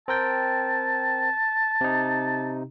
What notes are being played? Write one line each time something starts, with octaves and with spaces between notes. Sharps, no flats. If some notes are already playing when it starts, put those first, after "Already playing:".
C4 A#4 G5 A5
C3 D#4